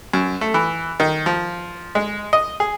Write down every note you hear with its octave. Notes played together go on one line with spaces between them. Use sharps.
F#2
A3
E3
D#3
F3
G#3
D#5
G#4